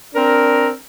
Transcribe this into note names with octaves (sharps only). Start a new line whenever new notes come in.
C4 D4 A#4